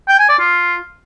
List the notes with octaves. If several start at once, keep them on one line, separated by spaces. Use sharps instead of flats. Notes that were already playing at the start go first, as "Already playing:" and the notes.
G5
G#5
D5
F4